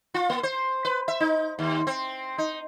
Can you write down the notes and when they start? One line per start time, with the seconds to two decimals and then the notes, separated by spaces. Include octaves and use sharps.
0.14 F4
0.30 A#3
0.43 C5
0.85 B4
1.08 E5
1.20 D#4
1.59 D#2
1.87 C4
2.38 D#4